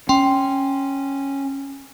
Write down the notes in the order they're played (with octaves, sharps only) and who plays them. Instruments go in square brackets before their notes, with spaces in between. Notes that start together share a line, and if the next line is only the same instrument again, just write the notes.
[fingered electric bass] C#4 [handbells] G5 C6